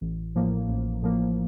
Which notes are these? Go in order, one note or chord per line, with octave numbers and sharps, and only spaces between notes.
A1
A2 F3 A#3
A1
A2 F3 A#3